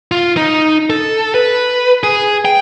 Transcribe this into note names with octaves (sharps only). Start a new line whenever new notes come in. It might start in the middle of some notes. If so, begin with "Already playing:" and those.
F4
D#4
A4
B4
G#4
G5